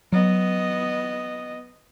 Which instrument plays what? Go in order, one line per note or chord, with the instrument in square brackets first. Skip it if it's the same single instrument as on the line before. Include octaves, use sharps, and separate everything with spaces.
[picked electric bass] F#3 [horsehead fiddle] B3 D#5